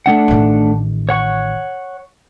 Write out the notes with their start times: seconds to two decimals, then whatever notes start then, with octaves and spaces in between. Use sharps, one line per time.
0.06 A3 D4 F#5
0.28 A1 D#3
1.09 C#5 F#5 C#6